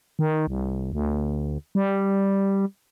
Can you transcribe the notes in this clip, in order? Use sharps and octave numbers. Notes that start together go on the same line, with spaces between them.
D#3
C2
D2
G3